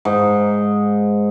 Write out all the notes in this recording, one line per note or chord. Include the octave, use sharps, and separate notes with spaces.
G#2